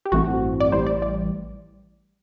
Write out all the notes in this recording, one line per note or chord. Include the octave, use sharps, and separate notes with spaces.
G4
A1 G2 E3 A3 C4 F#4
D5
A1 A2 E3 G3 C5
D5
D5